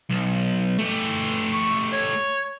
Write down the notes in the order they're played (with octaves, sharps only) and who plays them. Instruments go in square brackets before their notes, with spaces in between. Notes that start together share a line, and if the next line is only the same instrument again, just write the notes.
[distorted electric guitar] B1
A3 G4
[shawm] C#6
C#5